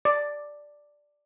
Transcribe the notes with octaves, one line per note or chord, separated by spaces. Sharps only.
D5